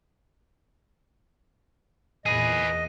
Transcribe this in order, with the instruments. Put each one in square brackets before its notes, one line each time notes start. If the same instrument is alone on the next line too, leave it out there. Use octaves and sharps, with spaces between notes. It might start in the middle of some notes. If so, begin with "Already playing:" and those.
[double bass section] E2 A#2 [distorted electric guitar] G#4 B4 [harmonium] D#5 [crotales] D#7